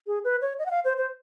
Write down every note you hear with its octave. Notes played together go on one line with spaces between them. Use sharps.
G#4
B4
C#5
D#5
F#5
F5
C5
C5